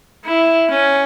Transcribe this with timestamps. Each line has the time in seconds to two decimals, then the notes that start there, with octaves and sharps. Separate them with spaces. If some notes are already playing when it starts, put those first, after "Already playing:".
0.24 E4
0.70 C#4